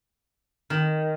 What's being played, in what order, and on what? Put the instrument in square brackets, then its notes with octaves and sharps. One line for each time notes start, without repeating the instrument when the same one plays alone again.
[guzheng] D#3